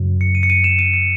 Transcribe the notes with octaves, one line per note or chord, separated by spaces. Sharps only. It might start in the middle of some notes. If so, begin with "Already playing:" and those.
Already playing: F#2 C#3 F#3
C#7
D#7
C#7
D#7
E7
D#7
C#7